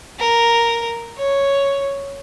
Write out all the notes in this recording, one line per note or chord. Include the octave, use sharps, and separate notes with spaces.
A#4
C#5